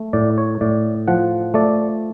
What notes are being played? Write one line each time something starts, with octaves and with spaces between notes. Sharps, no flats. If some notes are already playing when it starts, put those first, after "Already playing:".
Already playing: A3
A2 D5
C#5
A2 D5
F3 F#5
A3 D5